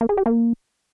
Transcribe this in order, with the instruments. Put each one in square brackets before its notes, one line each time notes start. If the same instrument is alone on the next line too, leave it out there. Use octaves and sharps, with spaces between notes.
[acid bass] A#3
G#4
G4
A#3